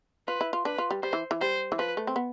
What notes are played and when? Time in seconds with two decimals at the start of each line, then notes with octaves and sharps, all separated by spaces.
0.28 F4 B4
0.41 E4
0.53 F4
0.65 D4 B4
0.78 F4
0.91 G3
1.03 G3 C5
1.13 E3
1.31 E3
1.41 G3 C5
1.72 E3
1.79 F3 B4
1.97 A3
2.07 C4
2.16 B3